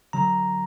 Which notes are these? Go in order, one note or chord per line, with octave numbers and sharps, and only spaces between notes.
D3 F#3 A#5